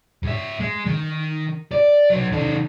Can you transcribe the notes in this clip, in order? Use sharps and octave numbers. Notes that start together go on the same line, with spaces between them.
G#2 E5
G#3
D#3
D5
F#3 D#4
D#3 A4